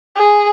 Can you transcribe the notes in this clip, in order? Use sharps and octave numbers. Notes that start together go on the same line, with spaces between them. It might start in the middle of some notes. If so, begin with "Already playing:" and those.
G#4